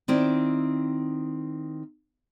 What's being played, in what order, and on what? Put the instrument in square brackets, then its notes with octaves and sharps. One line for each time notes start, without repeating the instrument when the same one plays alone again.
[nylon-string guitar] D#3 C4 E4 D5